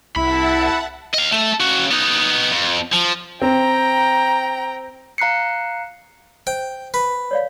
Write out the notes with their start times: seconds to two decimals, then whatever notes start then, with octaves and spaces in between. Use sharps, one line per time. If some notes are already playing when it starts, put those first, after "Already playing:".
0.16 C2 E4 E5 F#5 A5 B5
1.14 D#5 F5
1.32 A3
1.60 C#3 F#4
1.91 B3 D#4
2.51 F2
2.92 F3
3.42 C4 G5 A#5
5.18 F5 A#5 F#6 C7 C#7
6.47 C5 G5
6.94 B4
7.31 C#5 D5 F5